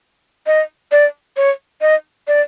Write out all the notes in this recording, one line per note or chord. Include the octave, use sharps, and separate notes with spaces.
D#5
D5
C#5
D#5
D5